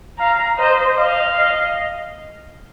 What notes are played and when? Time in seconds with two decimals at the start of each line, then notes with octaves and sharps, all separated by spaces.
0.19 F5 A#5
0.59 C5 D#5
0.98 D#5 F5
1.37 D#5